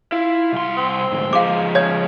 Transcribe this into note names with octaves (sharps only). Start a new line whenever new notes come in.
E4 F4
C2 C6
C4
D2 G#2
F3 G#3 F5 D6
C#3 C#5 G#6